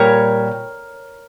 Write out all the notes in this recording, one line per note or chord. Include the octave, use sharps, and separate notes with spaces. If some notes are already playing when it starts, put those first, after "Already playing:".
Already playing: A#2 G3 A#4 C#5